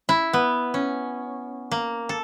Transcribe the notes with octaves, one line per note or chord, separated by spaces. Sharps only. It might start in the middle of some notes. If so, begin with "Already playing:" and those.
E4
B3
C#4
A#3
A4